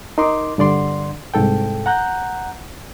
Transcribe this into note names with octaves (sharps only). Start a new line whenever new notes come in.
D#4 A#4 C6 D6
G2 D3 D5 C6
C2 G#2 A4 G5
F#5 A#5 F#6 G6